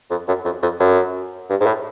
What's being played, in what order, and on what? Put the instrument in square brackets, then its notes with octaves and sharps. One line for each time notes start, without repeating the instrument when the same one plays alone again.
[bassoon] F2
F#2
F2
F2
F#2
G2
G#2
A2